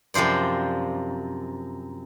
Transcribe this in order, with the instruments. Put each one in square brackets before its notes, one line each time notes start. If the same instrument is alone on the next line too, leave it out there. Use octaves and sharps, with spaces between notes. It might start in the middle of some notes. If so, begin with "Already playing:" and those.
[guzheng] F#2 C3 F3 C5 D5